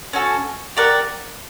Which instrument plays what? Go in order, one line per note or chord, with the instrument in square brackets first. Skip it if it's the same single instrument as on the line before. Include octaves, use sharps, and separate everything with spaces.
[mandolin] C#4 F#4 A4
G4 A#4 D5 F#5